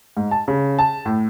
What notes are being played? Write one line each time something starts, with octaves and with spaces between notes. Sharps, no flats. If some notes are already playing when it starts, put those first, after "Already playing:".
G#2
A5
C#3
A5
A2